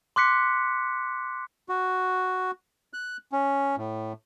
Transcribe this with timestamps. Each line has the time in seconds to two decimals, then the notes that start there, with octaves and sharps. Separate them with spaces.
0.16 C6 D6 F#6 B6 C#7
1.69 F#4
2.93 F#6
3.32 C#4
3.77 A2